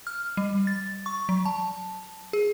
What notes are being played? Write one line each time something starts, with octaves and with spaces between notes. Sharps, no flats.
F6
G3
A6
C#6
F#3
A5
G#4